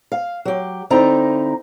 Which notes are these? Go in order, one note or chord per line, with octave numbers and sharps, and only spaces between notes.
F5
F#3 G4
D3 C4 D#4 E4 A#5